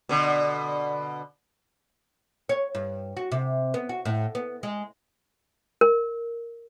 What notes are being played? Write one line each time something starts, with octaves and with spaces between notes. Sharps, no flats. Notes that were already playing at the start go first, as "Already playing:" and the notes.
B2 D3
C#5
G2
F#4
C3
B3
F#4
A2
B3
G#3
A#4